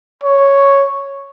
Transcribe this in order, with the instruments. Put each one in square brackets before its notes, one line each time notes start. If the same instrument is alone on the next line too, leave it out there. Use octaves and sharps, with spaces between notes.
[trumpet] C#5